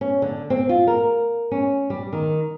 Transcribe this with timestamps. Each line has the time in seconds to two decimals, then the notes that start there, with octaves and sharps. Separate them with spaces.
0.01 C#4
0.22 D3
0.50 C4
0.69 F4
0.87 A#4
1.51 C#4
1.90 G3
2.13 D#3